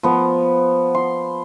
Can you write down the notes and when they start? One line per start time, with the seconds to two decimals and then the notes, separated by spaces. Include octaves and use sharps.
0.03 F3 B3
0.95 C6